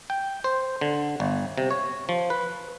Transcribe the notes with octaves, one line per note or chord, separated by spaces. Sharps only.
G5
C5
D3
G1
C3
C#5
F3
B4